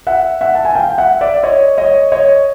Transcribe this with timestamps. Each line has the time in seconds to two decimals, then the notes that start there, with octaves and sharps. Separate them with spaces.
0.07 E5 F#5
0.41 E5 F#5
0.55 A5
0.65 G#5
0.75 F5 G5
0.98 E5 F#5
1.21 D5 E5
1.43 C#5 D#5
1.78 C#5 D#5
2.12 C#5 D#5